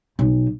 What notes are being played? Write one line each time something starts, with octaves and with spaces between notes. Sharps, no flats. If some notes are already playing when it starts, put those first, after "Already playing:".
B1